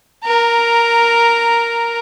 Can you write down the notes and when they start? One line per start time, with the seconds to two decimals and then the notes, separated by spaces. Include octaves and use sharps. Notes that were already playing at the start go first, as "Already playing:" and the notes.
0.24 A#4 A#5